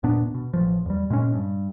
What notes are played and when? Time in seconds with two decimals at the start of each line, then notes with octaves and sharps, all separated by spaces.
0.03 D#1 A#2 B3 D4
0.34 B2
0.53 A1 F3
0.86 E2 G3
1.10 A#2 G#3 C4 C#4
1.34 G2